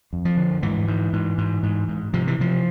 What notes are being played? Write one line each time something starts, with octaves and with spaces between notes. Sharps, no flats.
F2
F3
D3
G#2 E3
G#2
G#2
G#2
G#2
G#2
C3 F3
E3
C3 F3